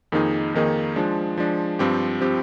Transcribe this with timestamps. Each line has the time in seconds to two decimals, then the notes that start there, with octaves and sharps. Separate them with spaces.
0.12 F2 D#3 A#3 D#4 G#4
0.54 F2 D#3 A#3 D#4 G#4
0.96 F3 G#3 D4
1.38 F3 G#3 D4
1.79 G2 F3 C4 G4
2.21 F3 C4 G4